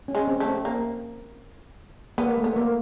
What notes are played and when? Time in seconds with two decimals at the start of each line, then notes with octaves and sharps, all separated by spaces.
0.08 C#4
0.15 G#3
0.28 C4
0.40 A3
0.46 C4
0.65 A#3
2.18 A#3 B3
2.38 A3
2.44 B3
2.56 A#3